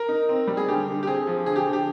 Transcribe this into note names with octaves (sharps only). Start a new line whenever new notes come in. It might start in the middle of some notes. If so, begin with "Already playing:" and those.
Already playing: A#4
D#4
C4
G3
G#4
D3 G4
D3
G4
C4 G#4
F3
D3 G#4
G4
D3
G4